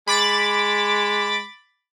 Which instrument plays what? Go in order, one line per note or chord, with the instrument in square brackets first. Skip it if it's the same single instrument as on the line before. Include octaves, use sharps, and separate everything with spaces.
[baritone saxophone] G#3 [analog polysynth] B5 D6 A6